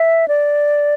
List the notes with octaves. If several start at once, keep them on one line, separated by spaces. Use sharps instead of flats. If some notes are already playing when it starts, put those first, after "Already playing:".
Already playing: E5
D5